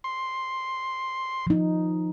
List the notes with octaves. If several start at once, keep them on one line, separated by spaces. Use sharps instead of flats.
C6
F3 D#4